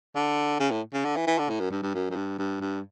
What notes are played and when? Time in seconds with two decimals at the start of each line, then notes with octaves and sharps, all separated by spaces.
0.16 D3
0.60 C#3
0.71 A2
0.94 C#3
1.05 D3
1.16 E3
1.27 E3
1.39 D3
1.50 A2
1.60 F#2
1.71 G2
1.83 G2
1.94 F#2
2.11 F#2
2.16 G2
2.39 G2
2.61 G2